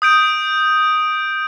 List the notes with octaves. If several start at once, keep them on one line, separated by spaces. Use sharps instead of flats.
D#6 G6 D7